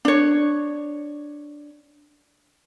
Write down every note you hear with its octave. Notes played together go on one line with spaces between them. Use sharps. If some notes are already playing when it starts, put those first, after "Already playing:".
D4 C#5